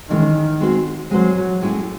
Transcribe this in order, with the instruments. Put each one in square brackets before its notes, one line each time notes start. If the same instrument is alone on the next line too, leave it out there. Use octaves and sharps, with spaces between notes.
[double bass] D#3 [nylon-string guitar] E3 G#3 C#4
[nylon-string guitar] G#3 C4 F#4 C5
[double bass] F#3 [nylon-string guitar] G#3 C4 F#4 C5
[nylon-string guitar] A2 G#3 C#4 E4 G#4